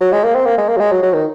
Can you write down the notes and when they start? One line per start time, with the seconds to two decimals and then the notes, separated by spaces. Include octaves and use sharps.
0.01 F#3
0.13 G#3
0.24 A#3
0.35 C4
0.46 A#3
0.58 G#3
0.69 A#3
0.76 F#3
0.80 G#3
0.92 F#3
1.02 F#3
1.14 D#3